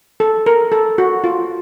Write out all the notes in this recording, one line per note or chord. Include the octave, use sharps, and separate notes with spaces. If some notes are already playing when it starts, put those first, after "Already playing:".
A4
A#4
A4
F#4
F4